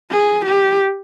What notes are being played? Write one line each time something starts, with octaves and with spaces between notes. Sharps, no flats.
G#4
G4